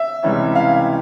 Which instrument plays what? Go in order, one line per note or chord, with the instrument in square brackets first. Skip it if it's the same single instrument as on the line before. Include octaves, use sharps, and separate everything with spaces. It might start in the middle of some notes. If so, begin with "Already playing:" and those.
Already playing: [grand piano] E5
C#2 C3 E3 G3 C#4
F5